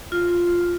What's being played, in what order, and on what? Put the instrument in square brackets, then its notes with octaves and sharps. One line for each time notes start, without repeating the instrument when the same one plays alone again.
[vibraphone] F4